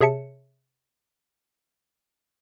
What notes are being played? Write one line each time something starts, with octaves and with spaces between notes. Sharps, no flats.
C3 G#4 C#5 E5 A5 C#7